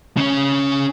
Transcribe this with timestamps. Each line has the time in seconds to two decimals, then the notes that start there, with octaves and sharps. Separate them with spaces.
0.17 C#3 C#4